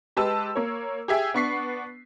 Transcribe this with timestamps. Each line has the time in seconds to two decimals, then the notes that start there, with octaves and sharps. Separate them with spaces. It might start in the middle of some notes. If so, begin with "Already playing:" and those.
0.17 G#3 G4 B4 A5 E6
0.55 A#3 C#5
1.08 G4 G#4 E5 G5
1.34 B3 D4 C#6 B6 C7